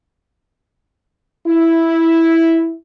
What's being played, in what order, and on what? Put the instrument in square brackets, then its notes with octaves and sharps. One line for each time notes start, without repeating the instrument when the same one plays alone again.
[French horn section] E4